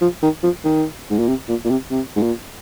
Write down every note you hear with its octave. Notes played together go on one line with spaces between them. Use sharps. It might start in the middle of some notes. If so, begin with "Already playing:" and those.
F3
D#3
F3
D#3
G#2
A#2
C3
A#2
A#2
C3
C3
G#2
A#2